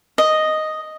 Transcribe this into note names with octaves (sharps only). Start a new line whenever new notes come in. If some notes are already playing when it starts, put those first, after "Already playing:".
D#5